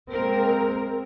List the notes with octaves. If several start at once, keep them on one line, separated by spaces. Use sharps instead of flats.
G#3 A#3 C4 A#4